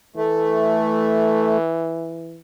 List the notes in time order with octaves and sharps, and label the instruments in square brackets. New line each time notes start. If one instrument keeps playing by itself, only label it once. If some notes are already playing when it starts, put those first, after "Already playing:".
[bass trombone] E3 [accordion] A3